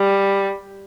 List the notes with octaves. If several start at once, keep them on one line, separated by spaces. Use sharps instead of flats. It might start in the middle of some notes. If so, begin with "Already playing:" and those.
Already playing: G3